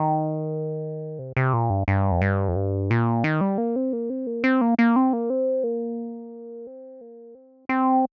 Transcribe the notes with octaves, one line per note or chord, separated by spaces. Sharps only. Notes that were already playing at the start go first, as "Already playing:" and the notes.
Already playing: D#3
C3
C3
A#2
G2
G2
F2
G2
F2
G2
A#2
D#3
G3
A#3
C4
A#3
C4
A#3
C4
A#3
A#3
C4
A#3
C4
A#3
C4
A#3
C4
C4